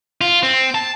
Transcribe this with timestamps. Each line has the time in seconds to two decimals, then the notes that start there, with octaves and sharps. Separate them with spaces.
0.21 F4
0.43 C4
0.75 A5